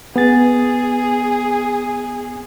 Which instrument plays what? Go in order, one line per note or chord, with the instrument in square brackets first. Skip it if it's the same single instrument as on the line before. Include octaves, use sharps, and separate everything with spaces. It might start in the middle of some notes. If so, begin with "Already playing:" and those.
[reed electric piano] B3 A6 [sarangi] G#4